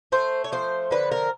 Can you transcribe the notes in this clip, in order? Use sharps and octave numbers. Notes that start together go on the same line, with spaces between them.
A3 C5
C#5
F3 C5
D3 B4
A#4